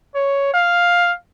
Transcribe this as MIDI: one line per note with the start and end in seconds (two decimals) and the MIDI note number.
0.15 0.51 73
0.54 1.14 77